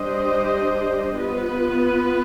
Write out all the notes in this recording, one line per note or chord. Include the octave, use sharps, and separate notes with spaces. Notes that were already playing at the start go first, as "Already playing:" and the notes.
Already playing: G3 D4 G4 C5 D#5
B3 F4 B4